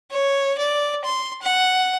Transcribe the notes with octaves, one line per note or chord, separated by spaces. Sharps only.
C#5
D5
C6
F#5